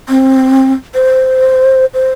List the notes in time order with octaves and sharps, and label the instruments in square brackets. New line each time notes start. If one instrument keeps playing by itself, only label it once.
[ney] C4
C5
C5